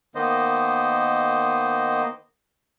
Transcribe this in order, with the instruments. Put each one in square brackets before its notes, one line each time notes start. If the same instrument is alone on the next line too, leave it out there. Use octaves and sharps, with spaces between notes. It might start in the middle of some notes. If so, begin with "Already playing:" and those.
[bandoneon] D#3 A#3 B3 C5 D#5